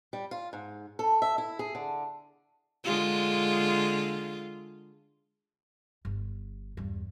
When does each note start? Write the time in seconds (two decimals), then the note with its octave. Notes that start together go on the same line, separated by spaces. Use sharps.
0.13 G3
0.31 F4
0.53 G#2
0.99 A4
1.22 E5
1.38 E4
1.59 G#4
1.75 D3
2.84 D3 G#3 F4
6.05 G1
6.77 E2 G2